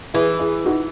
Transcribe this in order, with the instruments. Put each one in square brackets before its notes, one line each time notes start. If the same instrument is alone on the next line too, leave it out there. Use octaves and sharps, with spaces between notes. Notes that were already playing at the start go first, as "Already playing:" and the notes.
[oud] E3 [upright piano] E4 G#4
[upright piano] E4 G#4
D#4 F#4